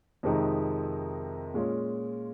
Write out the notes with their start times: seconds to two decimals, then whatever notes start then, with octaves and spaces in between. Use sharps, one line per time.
0.23 F2 C3 D#3 G#3 D#4
1.54 A#2 G#3 C#4 F4